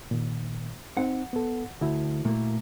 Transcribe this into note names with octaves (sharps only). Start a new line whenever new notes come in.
A#2 D#3
C4 D#4 F#5
B3 A4
D2 E4 F#4
A#2 A3 A#3